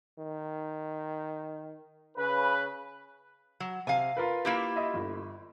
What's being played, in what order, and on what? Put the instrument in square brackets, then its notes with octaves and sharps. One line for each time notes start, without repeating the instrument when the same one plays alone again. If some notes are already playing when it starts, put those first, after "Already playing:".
[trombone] D#3
[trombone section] C#3 B4
[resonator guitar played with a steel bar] F#3
[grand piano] C3 [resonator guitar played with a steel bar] F5 G#5
[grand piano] F4 A#4 B4
[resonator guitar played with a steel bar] A#3 E4 G4
[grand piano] F4 D#5 E5
G1